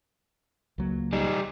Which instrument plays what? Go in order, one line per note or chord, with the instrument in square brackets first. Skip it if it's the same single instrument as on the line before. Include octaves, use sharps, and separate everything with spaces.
[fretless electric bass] C#2 F#3 A#3
[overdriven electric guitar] G3 D#4